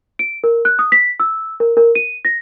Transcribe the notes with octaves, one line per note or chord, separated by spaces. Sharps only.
D7
A#4
F#6
D#6
B6
E6
A#4
A#4
D#7
A#6